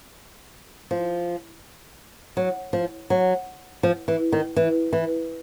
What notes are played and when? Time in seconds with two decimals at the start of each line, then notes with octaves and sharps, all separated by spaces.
0.91 F3
2.37 F#3
2.73 F3
3.10 F#3
3.83 F3
4.08 E3
4.32 D#3
4.56 E3
4.93 E3